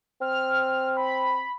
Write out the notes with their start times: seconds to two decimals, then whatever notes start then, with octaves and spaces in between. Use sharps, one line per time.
0.21 C4 F6
0.97 B5